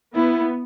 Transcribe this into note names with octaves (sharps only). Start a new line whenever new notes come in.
B3 E4